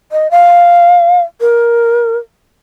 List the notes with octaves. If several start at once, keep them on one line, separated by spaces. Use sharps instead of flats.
D#5
F5
A#4